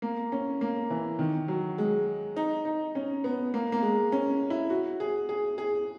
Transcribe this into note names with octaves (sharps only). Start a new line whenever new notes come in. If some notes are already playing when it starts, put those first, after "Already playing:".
A#3
C#4
A#3
E3
D#3
F#3
G#3
D#4
D#4
C#4
B3
A#3
A#3
G#3
C#4
E4
F#4
G#4
G#4
G#4